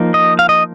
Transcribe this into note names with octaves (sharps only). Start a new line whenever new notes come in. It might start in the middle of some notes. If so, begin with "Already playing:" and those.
Already playing: F3 A#3 D#4
D#5
F5
D#5